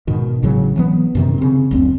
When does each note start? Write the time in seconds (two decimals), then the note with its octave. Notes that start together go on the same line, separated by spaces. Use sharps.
0.07 G#2 B2 D#3
0.42 G#1 A2 C#3 F#3
0.76 E3 F#3 B3
1.15 F#2 C3 D#3
1.38 C#3 C4
1.71 F#1 D2 C4